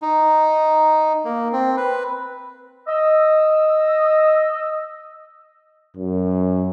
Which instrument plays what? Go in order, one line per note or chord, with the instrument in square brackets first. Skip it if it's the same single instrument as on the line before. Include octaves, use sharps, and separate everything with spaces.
[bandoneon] D#4
A#3
C4
B4
[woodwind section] D#5 E6
[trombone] F#2